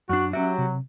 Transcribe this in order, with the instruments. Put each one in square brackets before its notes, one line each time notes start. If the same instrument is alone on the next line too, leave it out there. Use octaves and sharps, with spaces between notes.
[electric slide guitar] F#2 D4 [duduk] F#4
[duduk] F#3 [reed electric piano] C#4 E5 [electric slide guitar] F#4 G4
[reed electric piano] C3